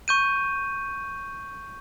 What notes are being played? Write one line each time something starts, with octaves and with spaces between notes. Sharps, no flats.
C#6 G6 D#7